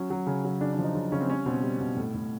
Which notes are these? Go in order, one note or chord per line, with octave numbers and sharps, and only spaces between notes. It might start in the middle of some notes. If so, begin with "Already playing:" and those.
Already playing: F#3 C#4
F#3
C#3
F#3
C#3 D4
D4
F3
D#4
C#3 F4
C#3 C#4
C4
G3 C#4
B2 C4
G3
B2
A2
A2